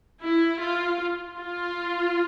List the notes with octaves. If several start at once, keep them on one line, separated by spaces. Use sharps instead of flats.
E4
F4
F4